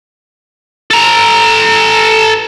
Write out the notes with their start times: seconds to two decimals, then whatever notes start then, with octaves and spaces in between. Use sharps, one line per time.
0.91 A4 A#5